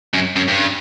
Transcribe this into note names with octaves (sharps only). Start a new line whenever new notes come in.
F#2
F#2
G2